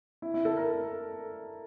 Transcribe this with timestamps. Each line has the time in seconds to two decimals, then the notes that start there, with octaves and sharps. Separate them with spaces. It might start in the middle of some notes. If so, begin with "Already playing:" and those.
0.22 E4
0.34 E4
0.45 A4
0.57 A#4